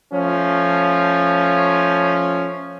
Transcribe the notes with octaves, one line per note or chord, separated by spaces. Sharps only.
F3 A3 C#4